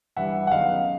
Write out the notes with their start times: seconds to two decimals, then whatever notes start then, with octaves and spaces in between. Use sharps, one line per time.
0.17 G2 E3 G3 E5 F#5
0.47 F#5
0.51 F#2 D#3 G#3 B3 D#4 D#5 F5